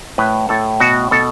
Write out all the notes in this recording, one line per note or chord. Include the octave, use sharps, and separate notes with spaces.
A2 B4
A2 A4
B2 F#4
B2 A4